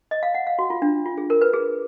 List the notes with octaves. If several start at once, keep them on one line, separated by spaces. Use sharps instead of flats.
D#5
F5
F#5
F5
F#4
F4
D4
F4
G#4
A#4
B4
G#4